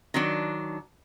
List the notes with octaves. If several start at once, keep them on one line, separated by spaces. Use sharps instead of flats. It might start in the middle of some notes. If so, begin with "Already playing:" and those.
D#3 F#3 D4